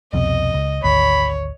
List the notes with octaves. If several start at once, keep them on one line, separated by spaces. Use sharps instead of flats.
C2 F2 B2 D#5
C#2
G#1 D2 C#5 B5